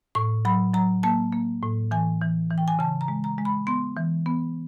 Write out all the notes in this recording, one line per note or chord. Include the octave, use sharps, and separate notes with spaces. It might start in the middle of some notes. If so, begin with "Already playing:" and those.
A2 C#6
F#3 B5
F#3 A#5
A#3 A5
A#3
A2
E3 G#5
E3
E3
G5
G#5
C#3 A5
A#5
G#3
A#5
G#3
B5
B3 C6
E3
B3